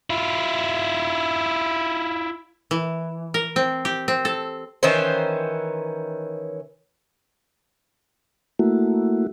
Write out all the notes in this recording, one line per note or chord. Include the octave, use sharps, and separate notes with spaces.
E4 F4
E3
A#4
C4
G4
C4
A4
D#3 E3 C#4 C5
A3 A#3 E4 F#4